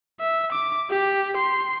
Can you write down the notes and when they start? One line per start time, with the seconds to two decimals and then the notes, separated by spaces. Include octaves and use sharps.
0.20 E5
0.52 D6
0.90 G4
1.37 C6